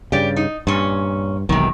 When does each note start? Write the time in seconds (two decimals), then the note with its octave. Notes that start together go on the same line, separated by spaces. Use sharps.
0.12 G2 C#3 G4 D5
0.36 D#4
0.67 G2 A#2 C#4
1.49 E1 B1 C3 D#3